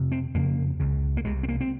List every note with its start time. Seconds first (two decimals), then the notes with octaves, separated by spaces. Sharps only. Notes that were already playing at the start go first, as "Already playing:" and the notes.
Already playing: F2 C3
0.12 C4
0.35 F2 C#3 A#3
0.80 C#2 C#3
1.17 A#3
1.25 C2 C3 G#3
1.43 C4
1.48 A#3
1.61 C4